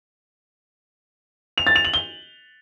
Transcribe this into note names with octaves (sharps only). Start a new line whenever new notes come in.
F7
A6
F7
F#7
G7